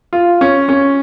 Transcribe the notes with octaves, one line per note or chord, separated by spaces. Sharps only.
F4
C#4
C#4